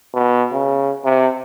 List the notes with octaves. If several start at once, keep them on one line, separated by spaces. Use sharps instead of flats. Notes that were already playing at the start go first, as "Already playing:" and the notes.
B2
C#3
C3